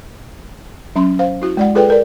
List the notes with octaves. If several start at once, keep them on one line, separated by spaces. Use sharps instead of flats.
F#3 C#4 A#5 C6
C5 F5
E4 F#4
G#3 D5 F#5
F4 G#4 A4 B4 D5 G5
A4 A#4 D5